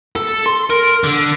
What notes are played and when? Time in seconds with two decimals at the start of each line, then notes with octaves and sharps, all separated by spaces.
0.16 A4
0.46 C6
0.70 A#4
1.04 D3